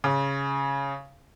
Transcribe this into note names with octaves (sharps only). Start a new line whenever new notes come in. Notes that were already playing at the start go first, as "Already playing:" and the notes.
C#3